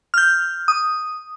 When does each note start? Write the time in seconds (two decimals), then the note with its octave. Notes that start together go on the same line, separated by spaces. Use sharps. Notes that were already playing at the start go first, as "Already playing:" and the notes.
0.14 F6 G6
0.68 D#6